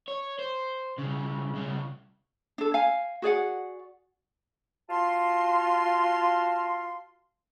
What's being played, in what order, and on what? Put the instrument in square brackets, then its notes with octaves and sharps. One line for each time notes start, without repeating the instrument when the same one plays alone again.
[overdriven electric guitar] C#5
C5
C2 C#3
C2 C#3
[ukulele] D4 A4
F5 G#5
F#4 G#4 D5 F#5
[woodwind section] F4 F#4 A5 C6